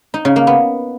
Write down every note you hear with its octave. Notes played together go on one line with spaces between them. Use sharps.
D#4
C#3
A#3
B3